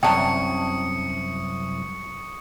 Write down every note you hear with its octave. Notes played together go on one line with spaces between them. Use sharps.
C2 F#2 G5 A5 A#5 C#6 D#6 C#7